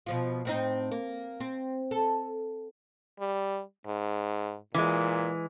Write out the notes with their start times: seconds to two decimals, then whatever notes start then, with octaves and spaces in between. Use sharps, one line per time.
0.06 B2 F3 F4
0.45 A2 C4 D#4
0.91 A#3
1.40 C4
1.91 A4
3.19 G3
3.86 G#2
4.75 A#2 E3 G#3